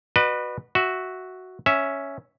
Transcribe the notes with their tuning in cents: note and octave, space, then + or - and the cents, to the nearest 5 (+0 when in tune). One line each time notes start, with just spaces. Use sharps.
F#4 +0 B4 -5 D#5 -45
F#4 +0 E5 -5
C#4 +0 E5 +0